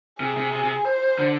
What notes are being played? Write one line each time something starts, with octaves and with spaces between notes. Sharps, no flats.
C3 G#4
C3
C3
C3
C5
D3